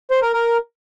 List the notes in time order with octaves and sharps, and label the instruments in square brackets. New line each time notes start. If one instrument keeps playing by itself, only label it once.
[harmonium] C5
A#4
A#4